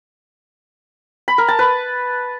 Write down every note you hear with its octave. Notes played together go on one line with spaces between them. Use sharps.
B5
A#4
A5
B4